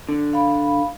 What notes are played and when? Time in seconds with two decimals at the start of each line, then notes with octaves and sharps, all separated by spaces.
0.09 D3
0.33 F5 B5